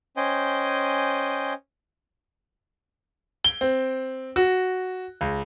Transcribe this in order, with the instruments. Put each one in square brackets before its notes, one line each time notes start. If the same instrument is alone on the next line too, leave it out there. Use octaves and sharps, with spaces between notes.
[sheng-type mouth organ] C#4 C5 D#5 G5 G#5
[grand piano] G7
C4
F#4
C#2